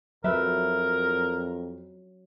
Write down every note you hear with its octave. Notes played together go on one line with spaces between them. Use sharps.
F2 F#3 A#4 B4 E5